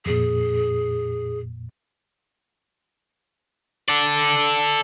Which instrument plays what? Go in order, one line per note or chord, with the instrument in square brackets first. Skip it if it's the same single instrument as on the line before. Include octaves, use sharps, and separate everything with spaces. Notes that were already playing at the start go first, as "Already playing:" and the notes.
[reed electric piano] F2 A#2 [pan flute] G#4
[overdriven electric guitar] A4 D5